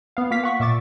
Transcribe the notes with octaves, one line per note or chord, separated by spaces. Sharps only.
B3 F5
A#3 F4 F5 B6
F#5 C#6 B6
A#2 E5 C#6 D6 A6